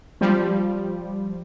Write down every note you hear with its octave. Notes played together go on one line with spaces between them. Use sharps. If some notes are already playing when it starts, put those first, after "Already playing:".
F3 G3